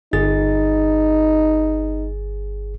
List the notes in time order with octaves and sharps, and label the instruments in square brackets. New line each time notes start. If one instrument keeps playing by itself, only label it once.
[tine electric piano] G1 G#4 A6 [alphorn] D#4